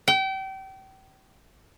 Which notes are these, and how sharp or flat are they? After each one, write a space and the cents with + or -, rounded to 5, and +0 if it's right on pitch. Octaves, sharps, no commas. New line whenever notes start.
G5 -30